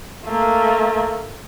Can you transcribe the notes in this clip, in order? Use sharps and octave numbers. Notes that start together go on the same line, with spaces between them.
A3 A#3